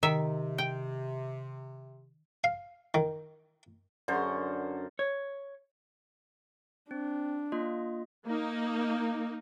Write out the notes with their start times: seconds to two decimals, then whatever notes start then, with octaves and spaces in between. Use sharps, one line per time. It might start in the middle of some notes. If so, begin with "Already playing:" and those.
0.03 C3 D#3 E5
0.58 G5
2.44 F5
2.94 D#3
4.08 F#2 D3 C5
4.99 C#5
6.91 C4 D4
7.52 A#3 F4 D#5
8.26 A#3 D#4